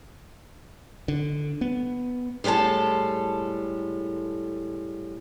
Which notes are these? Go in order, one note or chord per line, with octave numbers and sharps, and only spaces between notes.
D3
B3
A2 G3 G#3 A4 A5